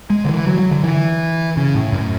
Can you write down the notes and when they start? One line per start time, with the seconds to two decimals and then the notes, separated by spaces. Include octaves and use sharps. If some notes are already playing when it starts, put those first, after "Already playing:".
0.10 G#3
0.25 D3
0.28 E3
0.47 F#3
0.59 F#3
0.71 D3
0.83 E3
1.57 C#3
1.75 A2
1.92 F#2